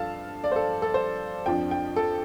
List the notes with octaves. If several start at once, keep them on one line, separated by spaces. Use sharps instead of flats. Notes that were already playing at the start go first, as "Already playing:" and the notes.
Already playing: G2 F3 A4 F5 A5
D5
C5
A4
A4
C5
F2 F3 D4 G5
G5
A4